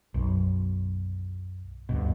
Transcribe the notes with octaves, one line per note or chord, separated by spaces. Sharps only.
B1 F#2
D2 G2 B2